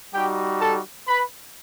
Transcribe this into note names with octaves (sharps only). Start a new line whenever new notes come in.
G3 D#4 F#4 G4 G5
A4 A5
B4 B5